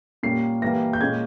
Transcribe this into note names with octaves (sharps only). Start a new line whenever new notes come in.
A#2 G3 A#3 C#4 C7
E3 G3 A#3 A#6
G6
A#2 G#3 C#4 G#6